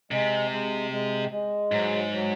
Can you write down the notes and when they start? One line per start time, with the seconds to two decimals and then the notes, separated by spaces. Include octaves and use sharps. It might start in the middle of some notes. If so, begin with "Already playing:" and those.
0.11 C3 G#3
0.51 G#3
0.91 G#3
1.31 G#3
1.71 G#2 F#3
2.12 F#3